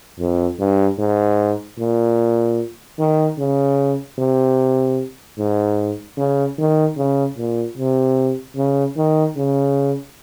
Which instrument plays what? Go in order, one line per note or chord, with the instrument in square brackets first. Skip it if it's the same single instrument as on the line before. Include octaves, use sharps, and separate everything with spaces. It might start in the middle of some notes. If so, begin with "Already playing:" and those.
[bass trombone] F2
G2
G#2
A#2
D#3
C#3
C3
G#2
C#3
D#3
C#3
A#2
C3
C#3
D#3
C#3